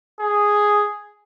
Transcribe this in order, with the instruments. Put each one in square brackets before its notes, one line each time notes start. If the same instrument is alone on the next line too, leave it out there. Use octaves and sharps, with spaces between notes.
[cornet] G#4